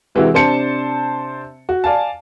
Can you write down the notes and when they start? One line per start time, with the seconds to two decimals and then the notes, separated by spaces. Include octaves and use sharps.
0.15 C3 E3 G#3 C4 E4 F#4
0.34 C3 D4 C5 A5 C#7
1.69 F#4
1.84 D5 F5 G#5 A5